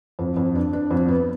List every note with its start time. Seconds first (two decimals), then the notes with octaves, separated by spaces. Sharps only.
0.19 F2
0.37 F2
0.55 D4
0.73 D4
0.91 F2
1.08 B3